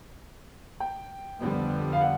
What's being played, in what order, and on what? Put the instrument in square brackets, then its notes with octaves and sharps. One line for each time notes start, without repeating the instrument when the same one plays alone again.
[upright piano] G5
[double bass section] F2 D3 G3 B3
[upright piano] F5
F#5